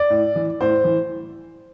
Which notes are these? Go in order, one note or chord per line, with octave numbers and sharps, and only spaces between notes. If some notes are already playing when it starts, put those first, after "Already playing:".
Already playing: D5
A2
E3
A2 C5
E3